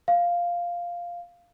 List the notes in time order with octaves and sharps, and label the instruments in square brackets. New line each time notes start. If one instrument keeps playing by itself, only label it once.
[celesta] F5